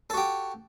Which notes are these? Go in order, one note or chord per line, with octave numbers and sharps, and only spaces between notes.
F#4 G4 A4